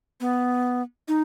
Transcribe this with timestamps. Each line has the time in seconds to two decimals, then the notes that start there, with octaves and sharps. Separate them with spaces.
0.21 B3
1.08 D#4